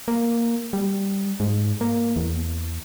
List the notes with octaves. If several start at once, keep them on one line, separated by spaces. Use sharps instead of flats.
A#3
G3
G#2
A#3
E2